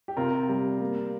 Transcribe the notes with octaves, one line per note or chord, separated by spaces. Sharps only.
G4
C3 F4 A#4
G3
A#3